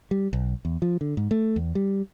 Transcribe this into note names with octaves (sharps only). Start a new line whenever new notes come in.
G3
B1
E2
F3
D3
G#2
A3
E2
G3